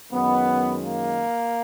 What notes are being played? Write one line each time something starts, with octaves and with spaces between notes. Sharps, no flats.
F#2 D#3 G#3 B3
A#3